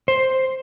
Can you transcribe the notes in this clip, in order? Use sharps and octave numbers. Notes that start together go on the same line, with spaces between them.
C5